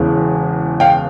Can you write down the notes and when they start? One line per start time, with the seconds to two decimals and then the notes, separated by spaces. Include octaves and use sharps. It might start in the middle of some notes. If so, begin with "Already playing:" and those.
Already playing: E1 E2 C#3 E3
0.80 F5 G5